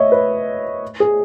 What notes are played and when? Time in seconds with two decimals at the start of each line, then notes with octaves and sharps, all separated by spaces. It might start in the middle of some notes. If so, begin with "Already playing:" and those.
Already playing: C#5 D#5 E5
0.12 B4
1.00 G#4